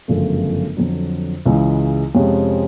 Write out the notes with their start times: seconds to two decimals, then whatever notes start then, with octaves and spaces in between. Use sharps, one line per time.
0.08 G1 F#2 C#3 F3 A3
0.77 F2 D3 F#3
1.46 C#2 C#3 E3 G#3
2.15 F2 C3 F3 G#3 C#4